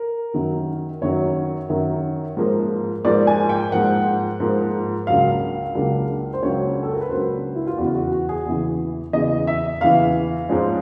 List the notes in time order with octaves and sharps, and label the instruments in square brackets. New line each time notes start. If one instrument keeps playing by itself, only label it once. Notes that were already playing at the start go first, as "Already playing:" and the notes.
Already playing: [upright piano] A#4
F#2 D#3 F#3
F#2 D#3 F#3 C#5
F#2 D#3 F#3
G#2 F3 A#3
G#2 F3 A#3 D5
G#5
G5
G#2 F3 A#3 F#5
G#2 F3 A#3
C#2 C#3 F#3 A#3 D4 F5
C#2 C#3 F#3 A#3 D4
C5
C#2 C#3 F#3 A#3 D4 C#5
A4
A#4
B4
C#2 C#3 F#3 A#3 D4 C5
E4
F4
E2 C#3 E3 F#4
F#4
F#4
G#4
E2 C#3 E3
E2 C#3 E3 D#5
E5
E2 C#3 E3 F5
G#2 F3 G#3 C#4